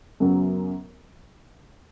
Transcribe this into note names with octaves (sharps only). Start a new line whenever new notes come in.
F#2 C#3 F#3 B3